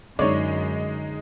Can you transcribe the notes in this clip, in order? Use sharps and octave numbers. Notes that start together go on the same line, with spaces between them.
F#2 D3 G#3 D#4 C#5 D5